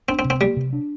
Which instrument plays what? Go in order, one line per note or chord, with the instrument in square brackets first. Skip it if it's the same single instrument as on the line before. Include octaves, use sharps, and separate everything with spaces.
[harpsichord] C4 [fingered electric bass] D4
[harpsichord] C4
[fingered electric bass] C3
[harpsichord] C4
[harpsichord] G3 [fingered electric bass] A#3
[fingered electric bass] C3
D4